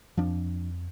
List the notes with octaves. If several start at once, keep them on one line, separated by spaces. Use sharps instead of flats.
F2 F3 D4